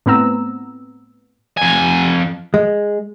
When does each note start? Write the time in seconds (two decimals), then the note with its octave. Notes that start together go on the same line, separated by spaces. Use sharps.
0.06 A2 B3 C4 A#5 E6
1.57 F2 G#5
2.54 G#3